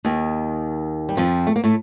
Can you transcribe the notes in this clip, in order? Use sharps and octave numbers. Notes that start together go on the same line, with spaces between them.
D#2 D#3
G3
F2 F3
A3
A#3
A2 A3